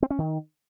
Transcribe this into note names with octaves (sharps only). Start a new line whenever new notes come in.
C4
C#4
D#3